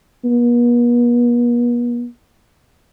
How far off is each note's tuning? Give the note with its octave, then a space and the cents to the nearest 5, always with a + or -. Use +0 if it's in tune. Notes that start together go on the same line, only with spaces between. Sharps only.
B3 -45